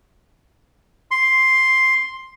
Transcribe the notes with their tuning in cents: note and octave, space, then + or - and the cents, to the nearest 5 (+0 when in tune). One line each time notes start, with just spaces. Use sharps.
C6 +5